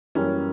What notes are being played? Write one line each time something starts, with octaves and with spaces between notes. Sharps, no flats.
F#2 E3 G3 A#3 C#4